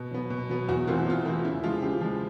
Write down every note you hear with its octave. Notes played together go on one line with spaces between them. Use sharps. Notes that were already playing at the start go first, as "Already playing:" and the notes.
Already playing: B2
F#3 B3
B2
F#3 B3
E2 F#4
C3 E3 A3 C4 F4
F#4
E2 F4
C3 E3 A3 C4
C#3 E4
F3 G#3 F4
C#3 G4
F3 G#3